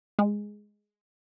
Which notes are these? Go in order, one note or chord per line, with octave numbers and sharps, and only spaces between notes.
G#3